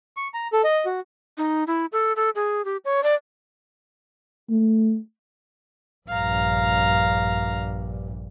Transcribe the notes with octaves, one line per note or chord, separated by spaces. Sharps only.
C#6
A#5
A4
D#5
F#4
D#4
E4
A4
A4
G#4
G4
C#5
D5
A3
A#1 G2 F5 A#5